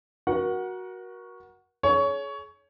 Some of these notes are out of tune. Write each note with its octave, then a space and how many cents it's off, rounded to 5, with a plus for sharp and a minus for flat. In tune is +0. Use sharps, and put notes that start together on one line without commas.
F#4 +0 A#4 +30 F#5 +0
G#4 +40 C#5 +15